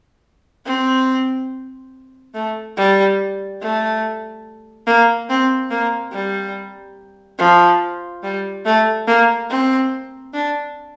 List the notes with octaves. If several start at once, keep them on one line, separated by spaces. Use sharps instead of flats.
C4
A3
G3
A3
A#3
C4
A#3
G3
F3
G3
A3
A#3
C4
D4